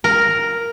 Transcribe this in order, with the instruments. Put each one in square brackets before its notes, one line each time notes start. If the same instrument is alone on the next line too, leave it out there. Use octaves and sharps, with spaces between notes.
[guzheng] A#4